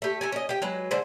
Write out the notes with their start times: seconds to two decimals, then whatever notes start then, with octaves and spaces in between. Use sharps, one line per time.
0.02 A3 G4
0.21 A4 A#4 G#5
0.32 C#4 D#5
0.49 G4 G5
0.62 F#3 G#3 B4
0.91 D3 G#3 C5